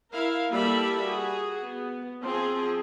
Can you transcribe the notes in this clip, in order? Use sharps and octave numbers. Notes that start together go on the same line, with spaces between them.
E4 A#4 F5
G3 A#3 E4 A4 E5 B5
F#4 G#4
B3
F3 C4 G#4